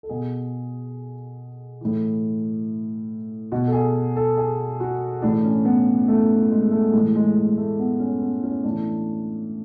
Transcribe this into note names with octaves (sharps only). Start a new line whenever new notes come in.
A4
B2 G#4
A2 E3
B2 F#4
A4
G#4
A4
G#4
F#4
A2 E3 D4
C#4
B3
A3
G#3
A3
A2 E3 G#3
G#3
G#3
A3
B3
C#4
B3
C#4
A2 E3 D4